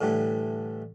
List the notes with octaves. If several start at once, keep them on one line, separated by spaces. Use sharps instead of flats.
A2 D3 E3 G3 A3